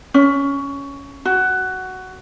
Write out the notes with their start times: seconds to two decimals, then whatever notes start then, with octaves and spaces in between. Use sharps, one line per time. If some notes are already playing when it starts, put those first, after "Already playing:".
0.14 C#4
1.25 F#4